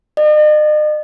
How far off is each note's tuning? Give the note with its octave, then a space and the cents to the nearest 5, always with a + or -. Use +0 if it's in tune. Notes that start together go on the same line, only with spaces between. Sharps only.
D#5 -45